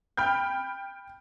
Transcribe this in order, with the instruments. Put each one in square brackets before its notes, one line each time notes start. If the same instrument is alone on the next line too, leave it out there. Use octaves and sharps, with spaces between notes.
[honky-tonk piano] G5 B5 F6 G6